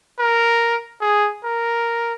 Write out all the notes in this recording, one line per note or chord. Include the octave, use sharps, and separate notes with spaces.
A#4
G#4
A#4